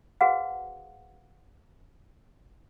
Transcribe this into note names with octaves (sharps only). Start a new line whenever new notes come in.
F#4 G#4 B4 C5 F5 F#5